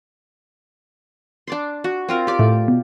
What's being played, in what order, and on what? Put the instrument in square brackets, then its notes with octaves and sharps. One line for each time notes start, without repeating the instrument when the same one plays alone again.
[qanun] D4 D5 C6
F#4
C4 F4 A#4
G4 D5
[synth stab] A2 A3
B2